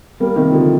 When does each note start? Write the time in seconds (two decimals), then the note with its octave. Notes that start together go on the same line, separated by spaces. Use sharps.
0.20 G3 A#3
0.36 C3 D#3
0.52 D3 F3